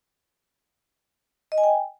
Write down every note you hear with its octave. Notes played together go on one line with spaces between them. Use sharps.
D#5
G#5
G5